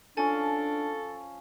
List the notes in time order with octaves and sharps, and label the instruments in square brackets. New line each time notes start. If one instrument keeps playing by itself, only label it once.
[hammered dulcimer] F3 C#4 A5 [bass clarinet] D4 [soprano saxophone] A4 [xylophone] G#5